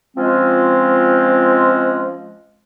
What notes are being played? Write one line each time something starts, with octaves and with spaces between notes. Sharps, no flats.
F3 G#3 C4 C#4 F4